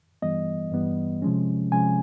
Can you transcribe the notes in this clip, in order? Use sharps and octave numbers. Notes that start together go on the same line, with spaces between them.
G2 E3 G3 B3 D#5
G2 E3 G3 B3
C3 F3 G#3 C#4
C3 F3 G#3 C#4 G#5